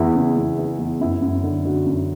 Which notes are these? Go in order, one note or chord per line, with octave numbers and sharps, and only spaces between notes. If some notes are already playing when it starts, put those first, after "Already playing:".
Already playing: E2 E3 E4
C#3
E2
E3
E2
F#2 E4
F#2
D3
D3 F#4
F#2